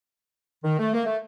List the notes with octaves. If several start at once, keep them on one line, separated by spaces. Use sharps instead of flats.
D#3
A3
A#3
A3